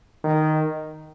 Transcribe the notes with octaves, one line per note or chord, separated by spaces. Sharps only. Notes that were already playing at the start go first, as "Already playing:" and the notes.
D#3